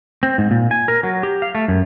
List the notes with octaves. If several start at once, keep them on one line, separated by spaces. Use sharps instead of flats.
C4
G#2
A#2
G#5
A#4
F#3
G4
F5
A3
F#2